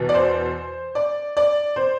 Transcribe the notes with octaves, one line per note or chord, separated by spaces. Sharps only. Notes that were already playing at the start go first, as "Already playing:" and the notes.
Already playing: E2 B2
D5
C5
D5
D5
C5